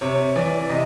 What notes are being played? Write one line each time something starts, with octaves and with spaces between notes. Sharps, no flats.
C3 C#5
E3 D5
C3 D#5